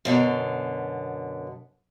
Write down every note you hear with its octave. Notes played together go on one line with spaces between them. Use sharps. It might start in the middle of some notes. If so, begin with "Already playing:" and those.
F#2 B2 D3